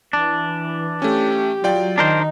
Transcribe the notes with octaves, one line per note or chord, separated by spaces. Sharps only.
E3 D4
A3 C#4 G4
F#3 F4 D5 G5
D#3 D4 D#4 A#4 C5